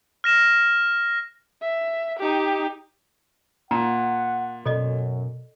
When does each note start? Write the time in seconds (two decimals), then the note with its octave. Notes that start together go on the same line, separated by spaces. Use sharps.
0.24 F6 A#6 E7
1.61 E5
2.19 D#4 G4
3.71 A#2 F#5 A#5
4.66 F#2 B2 A4 D5 D#5